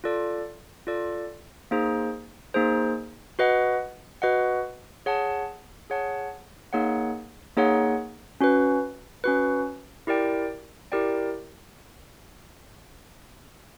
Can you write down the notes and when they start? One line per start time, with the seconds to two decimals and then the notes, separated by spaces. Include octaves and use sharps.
0.04 F4 A4 D5
0.87 F4 A4 D5
1.71 A#3 D#4 G#4 C5
2.54 A#3 D#4 G#4 C5
3.39 F#4 B4 D#5 F#5
4.22 F#4 B4 D#5 F#5
5.06 G#4 C#5 F#5 A5
5.90 G#4 C#5 F#5 A5
6.73 A#3 D#4 G#4 C#5 F#5
7.57 A#3 D#4 G#4 C#5 F#5
8.41 C#4 F#4 B4
9.24 C#4 F#4 B4
10.07 E4 G4 A#4 D5 G5
10.92 E4 G4 A#4 D5 G5